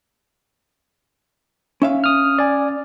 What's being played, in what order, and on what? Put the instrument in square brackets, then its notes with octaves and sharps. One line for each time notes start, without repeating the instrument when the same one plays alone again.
[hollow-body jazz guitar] C#4 E5 F5
[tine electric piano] D#6 F6
D5 G#5